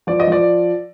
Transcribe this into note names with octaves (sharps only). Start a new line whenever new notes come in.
F3 D5
D#5
F3 D5